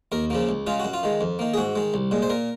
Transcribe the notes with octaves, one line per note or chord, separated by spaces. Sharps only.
D#2 A#4
C#3 F3 A#3
C#2
C#3 G#3 F4
F#4
F#2
F4
D#3 G#3
F2
D#3 A#3
G#4
G#2 F#4
D#3 G#3
C2
A#2 G#3
C5
A#2 A#4